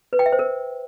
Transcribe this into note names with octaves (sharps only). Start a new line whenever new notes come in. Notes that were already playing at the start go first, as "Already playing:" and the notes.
B4
G5
E5
C5
A#4